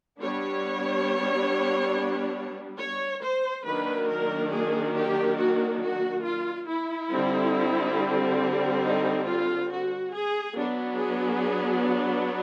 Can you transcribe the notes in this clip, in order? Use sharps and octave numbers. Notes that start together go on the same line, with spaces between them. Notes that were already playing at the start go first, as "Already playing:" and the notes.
G3 B3 D4 C#5
C#5
C5
D#3 F#3 A#3 D4 B4
A#4
G#4
G4
F#4
F#4
F4
E4
D3 G3 C4
D#4
F4
F#4
G#4
F#3 B3 D4
G#4